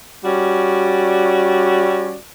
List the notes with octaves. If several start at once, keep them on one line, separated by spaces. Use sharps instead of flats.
G3 C#4 F#4 D5